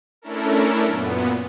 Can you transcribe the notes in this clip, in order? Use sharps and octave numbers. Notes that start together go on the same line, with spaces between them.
A3 C#4 D4 E4 A4 A#4
F#2 A#2 B3